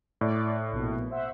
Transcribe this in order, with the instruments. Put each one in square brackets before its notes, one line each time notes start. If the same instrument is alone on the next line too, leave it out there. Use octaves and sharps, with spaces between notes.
[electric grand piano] A2 [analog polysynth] D5
[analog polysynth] A#1 B2
C5 E5 F#5